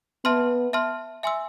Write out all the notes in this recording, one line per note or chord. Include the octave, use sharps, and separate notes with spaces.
B3 E5 A5 C6 F6
E5 A5 C6 F6
E5 G#5 C6 E6